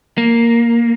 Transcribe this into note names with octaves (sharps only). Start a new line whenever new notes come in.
A#3